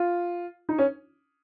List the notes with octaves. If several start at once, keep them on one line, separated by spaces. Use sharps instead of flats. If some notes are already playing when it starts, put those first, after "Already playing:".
Already playing: F4
D#4
C#4